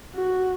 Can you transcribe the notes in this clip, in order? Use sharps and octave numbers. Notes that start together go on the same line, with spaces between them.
F#4